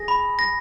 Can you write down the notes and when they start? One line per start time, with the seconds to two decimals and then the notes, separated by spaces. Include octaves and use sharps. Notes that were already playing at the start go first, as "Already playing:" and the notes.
Already playing: G#4 A#6
0.08 B5
0.39 A#6